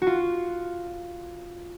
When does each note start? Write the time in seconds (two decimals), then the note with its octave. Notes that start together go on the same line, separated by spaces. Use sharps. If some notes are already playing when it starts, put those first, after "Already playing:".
0.02 F#4
0.07 F4